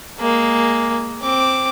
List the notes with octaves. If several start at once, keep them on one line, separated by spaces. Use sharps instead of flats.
G#3 A#3
C4 D6